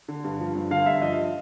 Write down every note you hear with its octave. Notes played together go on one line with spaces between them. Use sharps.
D3
G2
F3
G2
D3 F5
G2 E5
F3 D#5